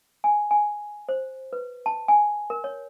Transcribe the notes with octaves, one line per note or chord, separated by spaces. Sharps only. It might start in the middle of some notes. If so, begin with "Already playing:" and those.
G#5
G#5
C5
B4
A5
G#5
A#4
C#5